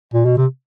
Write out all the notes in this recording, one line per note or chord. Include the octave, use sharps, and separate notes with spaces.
A#2
B2
C3